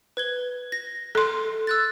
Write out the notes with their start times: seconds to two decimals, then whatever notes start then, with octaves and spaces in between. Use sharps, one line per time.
0.17 B4 G#6 G7
0.72 A#6
1.15 A4 C6
1.67 E6 F#6 A6